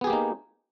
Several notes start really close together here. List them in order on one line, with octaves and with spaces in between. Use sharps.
B3 G#4 G4 A#3 D#4